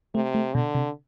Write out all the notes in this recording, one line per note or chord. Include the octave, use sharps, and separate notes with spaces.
C3 A3
A3
B2 D3
C3